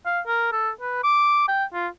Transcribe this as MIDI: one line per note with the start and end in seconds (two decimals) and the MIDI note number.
0.06 0.20 77
0.27 0.50 70
0.52 0.70 69
0.81 1.01 71
1.04 1.47 86
1.48 1.65 79
1.73 1.88 65